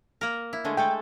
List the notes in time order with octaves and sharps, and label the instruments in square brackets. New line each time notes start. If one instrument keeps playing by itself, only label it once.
[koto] A#3 A#4
E4
D3 G#3 A3
[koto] G#3 A3 A4 [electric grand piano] G5